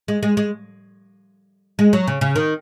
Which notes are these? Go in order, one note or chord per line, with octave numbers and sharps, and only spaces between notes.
G#3
G#3
G#3
G#3
F#3
C#3
C#3
D#3